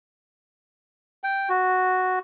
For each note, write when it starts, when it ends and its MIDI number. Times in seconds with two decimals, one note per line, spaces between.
1.24 1.49 79
1.49 2.19 66